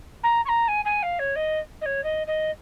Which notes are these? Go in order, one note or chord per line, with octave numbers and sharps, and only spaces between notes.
A#5
C#6
A#5
G#5
G#5
F5
C#5
D#5
D#5
C#5
D#5
D#5